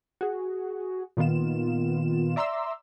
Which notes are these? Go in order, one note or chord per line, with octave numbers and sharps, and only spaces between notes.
F#4 G#4
A#2 D#3 B3 F4 E7
D5 E5 A#5 C6 D6 E6